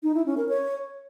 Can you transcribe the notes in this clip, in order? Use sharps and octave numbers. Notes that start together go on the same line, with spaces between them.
D#4
E4
C#4
A#4
C#5